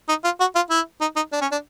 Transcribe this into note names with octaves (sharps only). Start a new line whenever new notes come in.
D#4
F4
F#4
F4
E4
D#4
D#4
D4
C#4
D4